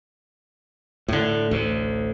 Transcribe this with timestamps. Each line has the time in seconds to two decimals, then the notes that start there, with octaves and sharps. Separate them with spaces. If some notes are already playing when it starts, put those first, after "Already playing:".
1.08 A2 D3
1.51 A1 D2